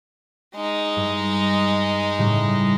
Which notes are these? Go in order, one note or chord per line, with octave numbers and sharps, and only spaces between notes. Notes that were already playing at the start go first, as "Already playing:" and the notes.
G#3 D#4
G2
A2 C#3 G3